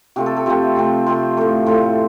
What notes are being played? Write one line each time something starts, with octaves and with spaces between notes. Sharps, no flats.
C3 F3 A3 C4 G4
A4
A4
C3 F3 A3 C4 C5
C3 F3 A3 C4
C3 F3 A3 C4 C5
A2 F3 A3
A2 F3 A3 C5